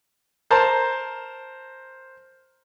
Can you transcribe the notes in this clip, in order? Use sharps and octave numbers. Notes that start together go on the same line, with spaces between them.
A#4 C5 A5 A#5 C6